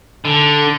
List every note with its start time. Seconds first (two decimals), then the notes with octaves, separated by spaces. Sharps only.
0.25 D3